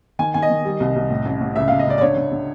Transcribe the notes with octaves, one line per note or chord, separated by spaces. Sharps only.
D#3 G#5
D#3 G#5
D#5
D#3
G3
C2
C2
A2
A1
A2
C#2 E5
C#2 F5
D#5
C#2 D5
D5
D3 C#5
D3
D3